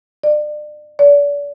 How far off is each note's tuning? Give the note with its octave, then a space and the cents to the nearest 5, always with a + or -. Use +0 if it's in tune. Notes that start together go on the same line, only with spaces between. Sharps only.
D5 +35
D5 -35